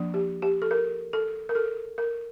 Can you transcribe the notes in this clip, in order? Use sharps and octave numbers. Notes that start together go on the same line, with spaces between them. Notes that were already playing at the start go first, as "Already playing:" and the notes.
Already playing: F3 A#3 D4
G4
G4
A4
A#4
A4
A#4
A4
A#4